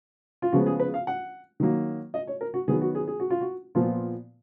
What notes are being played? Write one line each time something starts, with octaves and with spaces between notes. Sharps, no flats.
F4
C#3 F3 G#3 B3 F#4
G#4
B4
F5
F#5
D#3 F#3 A#3
D#5
C#5
A#4
F#4
D#3 F#3 B3 G#4
F#4
G#4
G#4
F#4
F4
F#4
A#2 F3 B3 F4